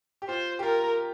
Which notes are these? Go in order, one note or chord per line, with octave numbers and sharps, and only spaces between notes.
G4
F4 C5
G4
F4 A#4